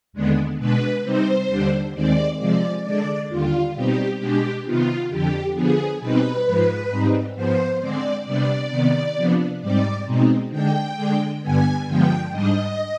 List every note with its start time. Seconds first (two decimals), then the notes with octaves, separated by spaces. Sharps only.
0.13 D#2 D3 G#3 B3 D4
0.59 B2 G#3 D4 B4
1.03 C3 G3 C4 D#4 C5
1.48 D#2 D3 G3 D4
1.94 D#2 D#3 G#3 C4 D5
2.38 C3 F3 G#3 D5
2.84 D3 G#3 D4 D5
3.29 D#2 D3 G3 F4
3.74 B2 G3 C4 D#4 G4
4.19 B2 G#3 D4 G4
4.65 C3 D#3 B3 F4
5.10 F2 D3 F3 G4
5.54 D3 F3 B3 G#4
6.00 B2 G3 C4 D#4 B4
6.45 G#2 F3 G#3
6.90 G#2 G3 C4 D#4
7.35 G#2 F3 B3 C5
7.80 D3 G#3 C4 D5
8.25 C3 G3 B3 D4 D5
8.71 C3 D#3 B3
9.17 C3 F3 B3 D4
9.61 G#2 G3 C4 D#4 D5
10.06 B2 G#3 C4 D#4
10.51 D3 G#3 D4 G5
10.96 D3 G#3 D4
11.42 G2 D3 G3 B3 G#5
11.86 G2 D3 F3 G#3 B3 G5
12.31 G#2 G3 D4 D#5